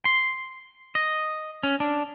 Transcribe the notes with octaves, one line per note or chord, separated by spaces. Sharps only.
C6
D#5
C#4
D4